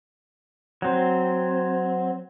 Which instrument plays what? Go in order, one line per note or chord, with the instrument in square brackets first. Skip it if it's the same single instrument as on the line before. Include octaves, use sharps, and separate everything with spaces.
[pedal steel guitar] F#3 C4